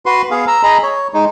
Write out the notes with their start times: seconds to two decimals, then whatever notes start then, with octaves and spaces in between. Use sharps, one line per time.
0.06 F#4 B4 C6
0.31 B3 G#4 F5
0.47 A#5 E6
0.63 G#4 D#5 A#5 B5
0.83 C#5
1.14 G#3 D#4